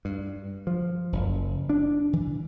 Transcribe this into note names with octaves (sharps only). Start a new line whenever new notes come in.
G2
F3
F#1
D4
E3